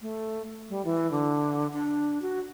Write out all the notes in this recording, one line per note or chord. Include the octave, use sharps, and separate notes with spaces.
A3
G3
E3
D3
D4
F#4